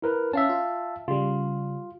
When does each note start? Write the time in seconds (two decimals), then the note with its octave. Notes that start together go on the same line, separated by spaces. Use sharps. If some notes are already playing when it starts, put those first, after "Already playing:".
0.02 E4 A#4 B4
0.33 C#4 E5 F5 A5
0.49 F4
1.08 C#3 G3 F4